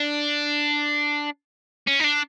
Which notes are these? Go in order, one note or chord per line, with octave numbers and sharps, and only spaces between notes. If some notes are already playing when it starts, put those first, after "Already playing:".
Already playing: D4
C#4
D#4
D4